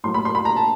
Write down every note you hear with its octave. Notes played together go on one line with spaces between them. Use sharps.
A2 F#3 A#3 C6
B5
C6
B5
A#5
A5